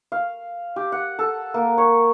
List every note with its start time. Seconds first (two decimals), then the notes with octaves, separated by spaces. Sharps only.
0.12 F5
0.76 G4
0.92 F#5
1.19 A4
1.54 A#3
1.78 C#5